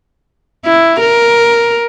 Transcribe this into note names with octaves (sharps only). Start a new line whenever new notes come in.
E4
A#4